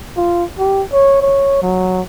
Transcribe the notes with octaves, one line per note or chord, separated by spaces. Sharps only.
F4
G4
C#5
C#5
F#3